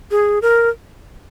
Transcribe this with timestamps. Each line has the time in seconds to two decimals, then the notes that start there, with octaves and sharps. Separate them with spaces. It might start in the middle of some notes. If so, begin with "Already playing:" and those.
0.11 G#4
0.42 A#4